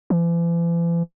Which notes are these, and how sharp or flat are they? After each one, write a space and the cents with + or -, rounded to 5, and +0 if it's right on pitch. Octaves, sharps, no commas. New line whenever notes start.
E3 +45